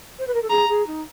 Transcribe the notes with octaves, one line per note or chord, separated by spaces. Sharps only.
C5
B4
A#4
A4
G#4 A#5
G#4
D#4